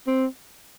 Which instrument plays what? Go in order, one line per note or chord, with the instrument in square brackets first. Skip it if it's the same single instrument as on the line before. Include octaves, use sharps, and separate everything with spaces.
[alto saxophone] C4